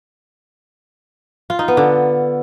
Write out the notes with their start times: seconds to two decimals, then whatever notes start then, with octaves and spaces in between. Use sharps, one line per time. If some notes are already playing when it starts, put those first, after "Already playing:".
1.50 F4
1.59 D#4
1.68 B3
1.77 D3